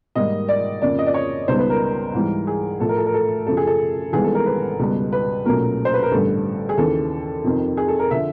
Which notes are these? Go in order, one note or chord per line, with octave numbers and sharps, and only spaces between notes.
G#2 D#3 G3 A#3 D#5
D5
F2 C#3 F3 A#3 D5
D#5
D5
C#5
C#2 B2 G3 B3 D#4 C5
B4
A#4
G#2 E3 G3
G#4
A2 F3 A3 A4
A#4
A4
A#4
A4
F#2 C#3 F3 A4
G#4
A4
G#1 G#2 E3 G3 B3 G#4
A4
A#4
B4
C#2 B2 G3
B4
B1 A#2 F#3 A3 C#4 A#4
C5
B4
A#4
A1 G2 D3 G3 A4
G#4
D#2 C#3 E3 A4
F2 C3 D#3
G#4
A4
A#4
D3 F3 E5